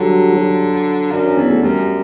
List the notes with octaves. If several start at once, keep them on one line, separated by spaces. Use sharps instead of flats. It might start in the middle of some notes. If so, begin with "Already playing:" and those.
Already playing: D3 F#3 G3
F#3
F#2 D4
C#4
E2 B3
A3
F#2 G3